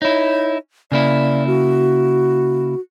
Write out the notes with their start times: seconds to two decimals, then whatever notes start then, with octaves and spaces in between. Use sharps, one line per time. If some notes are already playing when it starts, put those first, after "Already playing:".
0.02 D#4 E4 C#5
0.92 C#3 A#3 E4 D5
1.47 F#4